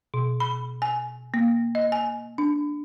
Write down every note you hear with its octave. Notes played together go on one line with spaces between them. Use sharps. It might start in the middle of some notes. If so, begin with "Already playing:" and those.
B2
B5
G#5
A#3
D#5
G#5
D4